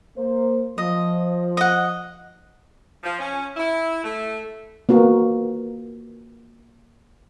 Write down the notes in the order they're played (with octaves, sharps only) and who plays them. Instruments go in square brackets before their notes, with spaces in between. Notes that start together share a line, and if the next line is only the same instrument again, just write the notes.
[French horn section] A#3 C5
[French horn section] F3 [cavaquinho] D#5
[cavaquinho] D#5 F#5
[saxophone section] F3
C#4
E4
A3
[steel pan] A#3 B3 F#4 A#4